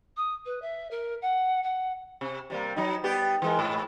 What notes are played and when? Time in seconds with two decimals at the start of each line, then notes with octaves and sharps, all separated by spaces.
0.17 D#6
0.45 B4
0.62 E5
0.91 A#4
1.22 F#5
1.63 F#5
2.21 C3
2.50 C3 G3 A#3
2.76 F#3 D#4
3.04 G3 B3 G4
3.42 E3 G#3 A#4
3.59 G#2